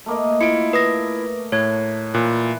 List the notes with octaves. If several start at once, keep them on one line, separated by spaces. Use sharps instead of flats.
A3 A#3 D#5
E4 F4 C#7 D7
B4 D#6 A#6
A2 C#5 G#6
A#2 E3 F#6